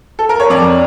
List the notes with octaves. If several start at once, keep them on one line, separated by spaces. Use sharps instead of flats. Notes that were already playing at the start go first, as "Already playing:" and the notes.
A4
A#4
C#5
F2 D5